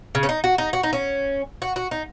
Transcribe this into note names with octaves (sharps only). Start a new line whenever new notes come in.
C#3
C#4
D#4
F#4
D#4
F#4
D#4
C#4
F#4
F#4
D#4